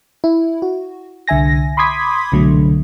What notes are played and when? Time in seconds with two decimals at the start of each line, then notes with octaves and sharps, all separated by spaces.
0.24 E4
0.62 F#4
1.28 C2 D3 E5 G#5 A#6
1.77 B5 C6 D6 D#6 G#6 B6
2.32 C2 B2 D3 F#3 A3